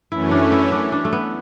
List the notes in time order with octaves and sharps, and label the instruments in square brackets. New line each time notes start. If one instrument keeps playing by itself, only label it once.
[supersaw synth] F#2 E3 A3 C#4 [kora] E4
[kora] D4
E4
D4
D4
A3
B3